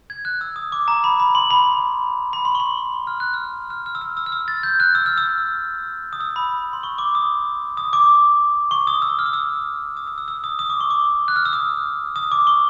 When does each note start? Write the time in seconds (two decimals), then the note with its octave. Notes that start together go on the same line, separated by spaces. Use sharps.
0.10 G#6
0.25 F#6
0.41 E6
0.56 D#6
0.72 D6
0.88 A#5
1.04 B5
1.20 B5
1.35 C6
1.51 B5
2.33 B5
2.45 C6
2.55 C#6
2.60 C6
3.07 F6
3.20 F#6
3.34 F6
3.70 F6
3.86 F6
3.95 E6
4.01 F6
4.17 E6
4.26 F6
4.32 E6
4.48 A6
4.63 G6
4.80 F#6
4.95 E6
5.06 F6
5.18 E6
6.13 D#6
6.21 E6
6.36 B5
6.73 C6
6.83 C#6
6.98 D6
7.15 D#6
7.77 D#6
7.93 D6
8.71 C#6
8.87 D#6
9.02 E6
9.19 F6
9.26 D#6
9.33 E6
9.97 D#6
10.07 E6
10.18 E6
10.28 E6
10.44 D#6
10.59 D#6
10.70 D6
10.81 C#6
10.90 D6
11.28 F#6
11.36 F6
11.45 E6
11.53 D#6
12.16 D#6
12.32 D6
12.47 C#6